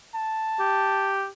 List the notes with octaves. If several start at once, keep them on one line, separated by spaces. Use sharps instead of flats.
A5
G4